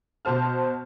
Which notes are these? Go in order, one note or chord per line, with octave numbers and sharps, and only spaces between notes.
B2 C5 A5 F6